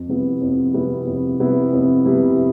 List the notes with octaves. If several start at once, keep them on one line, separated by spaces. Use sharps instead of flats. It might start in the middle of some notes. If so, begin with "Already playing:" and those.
Already playing: F2
C3 G3 B3 E4
F2
C3 G3 B3 E4
F2
C3 G3 B3 E4
F2
C3 G3 B3 E4